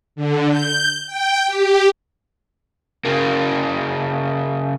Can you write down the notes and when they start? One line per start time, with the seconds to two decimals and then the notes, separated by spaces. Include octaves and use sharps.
0.16 D3
0.50 G6
1.07 G5
1.46 G4
3.05 C#3 A#3